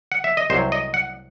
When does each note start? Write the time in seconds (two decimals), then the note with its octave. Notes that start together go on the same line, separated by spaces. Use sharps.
0.12 F#5
0.24 E5
0.37 D#5
0.50 C2 C3 F#3 C5
0.72 D#5
0.94 F#5